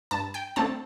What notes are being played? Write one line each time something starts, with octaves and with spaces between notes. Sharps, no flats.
G2 A5
G5
D3 A3 C4 A5